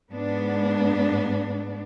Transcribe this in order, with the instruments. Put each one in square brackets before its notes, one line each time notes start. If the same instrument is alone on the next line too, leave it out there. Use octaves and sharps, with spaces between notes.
[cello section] G#2 B3 D4